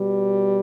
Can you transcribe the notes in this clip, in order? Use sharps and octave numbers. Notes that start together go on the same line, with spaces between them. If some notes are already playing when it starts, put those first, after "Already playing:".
Already playing: B2 G3